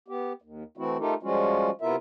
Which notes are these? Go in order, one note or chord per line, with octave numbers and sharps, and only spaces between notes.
B3 G4
D#2
E3 A3 C4 E4 F#4
A3 D#4 F4 G4 A4 A#4
F3 G3 G#3 C#4 F4 F#4
C3 B3 E4 F4 A#4 E5